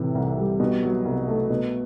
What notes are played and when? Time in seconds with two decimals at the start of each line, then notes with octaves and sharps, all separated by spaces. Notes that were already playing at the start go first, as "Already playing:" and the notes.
Already playing: A2 C3 E3
0.15 C2
0.37 G3
0.60 B2
0.83 F#3
1.05 C2
1.27 A3
1.50 B2